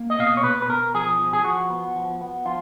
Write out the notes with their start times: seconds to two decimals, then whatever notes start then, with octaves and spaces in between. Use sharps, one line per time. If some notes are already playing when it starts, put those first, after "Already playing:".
Already playing: A#3
0.10 D#5
0.19 B2 F5
0.27 D#5
0.37 C#5
0.44 B2 B4
0.62 B4
0.69 B2 A#4
0.94 F3 G#4
1.19 F3
1.33 G#4
1.45 F3 F#4
1.70 B3
1.96 F3
2.21 B3
2.45 F3 F4